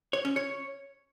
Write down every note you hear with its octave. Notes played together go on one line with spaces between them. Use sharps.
C#5
C#4
C#5